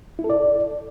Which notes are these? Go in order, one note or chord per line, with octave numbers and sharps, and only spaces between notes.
E4
A4
D5